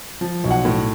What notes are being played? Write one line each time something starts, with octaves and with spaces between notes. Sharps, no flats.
F3
B1
F#5
A2